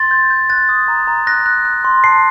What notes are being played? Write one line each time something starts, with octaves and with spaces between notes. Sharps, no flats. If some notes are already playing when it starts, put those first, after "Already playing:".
Already playing: C6 A6
G6
G6
F#6 A6
D#6
A#5
A#5
F#6 A#6
F#6
F#6
C6
A5 C7